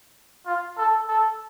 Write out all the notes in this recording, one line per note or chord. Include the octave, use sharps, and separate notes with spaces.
F4
A4
A4